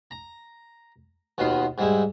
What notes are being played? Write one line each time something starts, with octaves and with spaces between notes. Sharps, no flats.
A#5
D#2 B2 B3 F4 C6
G#2 G3 G#3 E4